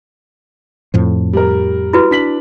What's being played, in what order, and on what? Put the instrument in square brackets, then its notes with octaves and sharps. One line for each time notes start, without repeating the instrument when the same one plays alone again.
[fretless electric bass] F2 A2 F3
[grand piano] G3 A#4
[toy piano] E4 F#4 B4
[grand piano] D4 B6 F#7